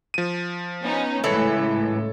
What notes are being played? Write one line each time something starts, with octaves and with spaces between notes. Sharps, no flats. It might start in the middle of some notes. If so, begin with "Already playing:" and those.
F3 D#7
B3 C#4 D#4
C#2 A2 E3 A4 C#5 C#7